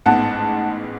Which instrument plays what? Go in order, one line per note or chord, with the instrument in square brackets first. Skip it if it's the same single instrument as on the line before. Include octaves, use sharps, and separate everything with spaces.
[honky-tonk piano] A1 G#2 G#3 B3 F#5 A5